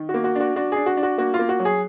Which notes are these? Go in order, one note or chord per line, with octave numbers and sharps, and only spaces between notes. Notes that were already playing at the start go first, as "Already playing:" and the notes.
Already playing: D#3
F#4
A#3
F#4
D4 F#4
D4 F#4
D4 G#4
F#4
D4
F#4
A#3 F#4
F4
A#3
F#4
F#3
G#4